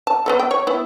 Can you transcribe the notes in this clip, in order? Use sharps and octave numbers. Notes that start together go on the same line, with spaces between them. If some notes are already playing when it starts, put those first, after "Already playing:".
A5
B3 C#4 A4
G5
C#5
B3 E4